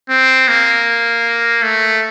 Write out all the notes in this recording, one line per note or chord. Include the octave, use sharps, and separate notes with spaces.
C4
A#3
A3